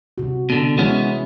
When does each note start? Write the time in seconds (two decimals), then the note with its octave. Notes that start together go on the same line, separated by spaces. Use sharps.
0.18 C3 F#4
0.50 B2 D3
0.78 E3 G#3 B3 C#4 E4